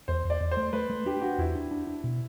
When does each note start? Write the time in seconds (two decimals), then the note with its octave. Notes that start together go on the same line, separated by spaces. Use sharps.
0.08 E2 C5
0.25 E2
0.30 D5
0.41 E2
0.51 C5
0.57 A3
0.73 A3 B4
0.90 A3
1.06 D4 G4
1.22 D4 F#4
1.38 E2 E4
1.55 D4
1.71 D4
1.87 D4
2.04 B2